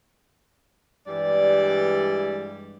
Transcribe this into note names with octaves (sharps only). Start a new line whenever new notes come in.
G2 E3 G3 G#3 D5